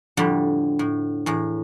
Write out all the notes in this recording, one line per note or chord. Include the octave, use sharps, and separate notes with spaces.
F2 A2 D3 G3
A2
E2 A2